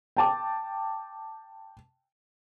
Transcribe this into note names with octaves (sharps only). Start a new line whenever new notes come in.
G5 A5 D6